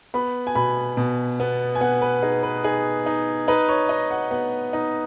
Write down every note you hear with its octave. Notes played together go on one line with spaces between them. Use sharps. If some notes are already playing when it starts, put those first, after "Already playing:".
B3 B5
G#5
B2 B5
B2
B3
G#5
B3 F#5
B4
D#4 G#4
B4
D#4 G#4
D#4
D#4 B4
C#5
D#4 D#5
F#5
B3 F#5
D#4